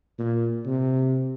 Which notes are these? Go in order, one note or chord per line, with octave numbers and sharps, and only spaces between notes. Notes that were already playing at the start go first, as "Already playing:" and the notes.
A#2
C3